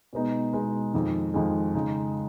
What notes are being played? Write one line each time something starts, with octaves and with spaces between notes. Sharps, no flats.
B2 G#3 B3 D#4
B2 G#3 B3 D#4
F2 D#3 G#3
F2 D#3 G#3
C#3 G#3 D#4